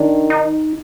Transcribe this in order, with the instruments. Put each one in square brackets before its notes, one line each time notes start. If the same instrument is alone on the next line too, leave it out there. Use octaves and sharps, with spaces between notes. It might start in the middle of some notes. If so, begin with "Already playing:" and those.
Already playing: [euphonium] D#3 [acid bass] D4
[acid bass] D#4